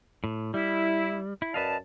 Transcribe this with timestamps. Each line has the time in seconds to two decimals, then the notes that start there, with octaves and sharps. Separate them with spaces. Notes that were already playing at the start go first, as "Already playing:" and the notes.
0.24 A2
0.54 G3 E4
1.42 E4
1.54 F#2 B4 D5 D#5 F5 A5